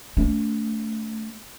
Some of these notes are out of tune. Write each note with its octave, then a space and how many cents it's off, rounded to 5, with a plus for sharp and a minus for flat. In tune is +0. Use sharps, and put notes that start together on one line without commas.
A3 +0 D4 -45